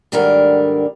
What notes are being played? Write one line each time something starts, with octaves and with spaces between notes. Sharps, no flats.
D2 G#2 D3 D#3 G3 A#4